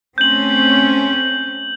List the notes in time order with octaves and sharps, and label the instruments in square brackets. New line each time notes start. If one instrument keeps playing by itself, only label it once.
[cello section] A3 C4 C#4 [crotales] G6 F#7